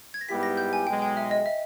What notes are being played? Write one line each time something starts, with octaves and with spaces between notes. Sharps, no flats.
G#6
A#6
G#2 G3 B3 E4 G4 B6
A#6
G6
G#5
B1 B2 G#3 G5
G5
E5
D#5
E5